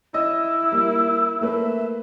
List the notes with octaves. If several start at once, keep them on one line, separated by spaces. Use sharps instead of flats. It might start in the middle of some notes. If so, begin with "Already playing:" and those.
E4 D#5 E6
G3 A#3
A3 A#3 B4 E5